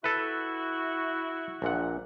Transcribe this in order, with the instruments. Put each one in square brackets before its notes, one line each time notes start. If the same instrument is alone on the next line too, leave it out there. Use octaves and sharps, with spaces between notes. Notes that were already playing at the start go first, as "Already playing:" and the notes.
[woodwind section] E4 F#4 [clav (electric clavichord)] A4 B4
[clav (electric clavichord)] A#1 A#2 F#5